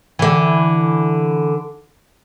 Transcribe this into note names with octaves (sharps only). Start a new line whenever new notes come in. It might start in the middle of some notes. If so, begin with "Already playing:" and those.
D3 E3